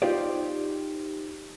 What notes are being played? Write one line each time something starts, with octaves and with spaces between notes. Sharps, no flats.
D#4 F4 G4 C5 D5